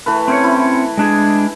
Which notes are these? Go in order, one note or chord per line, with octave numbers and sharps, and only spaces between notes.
E3 A3 B4
C4 C#4 C#5
E4
G#3 D4 G#4